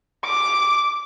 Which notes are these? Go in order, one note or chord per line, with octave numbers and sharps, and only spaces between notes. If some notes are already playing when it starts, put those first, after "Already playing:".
D6